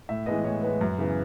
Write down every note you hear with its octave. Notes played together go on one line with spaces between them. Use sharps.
A2 E5
E3 G#3 B3 D#5
A2 C#5
E3 G#3 B3 B4
F#2
C#3 E3 B3